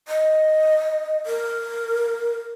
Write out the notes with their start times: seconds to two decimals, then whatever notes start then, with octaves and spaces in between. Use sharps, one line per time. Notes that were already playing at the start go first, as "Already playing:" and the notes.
0.08 D#5
1.26 A#4